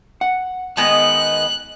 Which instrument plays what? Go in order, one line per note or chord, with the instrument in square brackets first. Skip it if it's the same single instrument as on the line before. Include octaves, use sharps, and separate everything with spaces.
[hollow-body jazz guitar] F#5
[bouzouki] D#3 G#3 B3 [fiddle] F#6